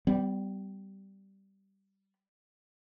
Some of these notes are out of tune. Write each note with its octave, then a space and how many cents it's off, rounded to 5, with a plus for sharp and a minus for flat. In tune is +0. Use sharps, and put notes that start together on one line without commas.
G3 -10 B3 +40